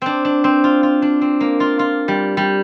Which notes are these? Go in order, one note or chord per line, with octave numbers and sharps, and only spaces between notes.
C4 D4
D4
C4
F4
F4
D4
C4
A#3
F4
F4
G3
G3